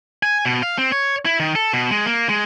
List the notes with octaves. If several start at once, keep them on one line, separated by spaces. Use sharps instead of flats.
G#5
B2
F5
C4
C#5
E4
D#3
A4
B2
G#3
A#3
G#3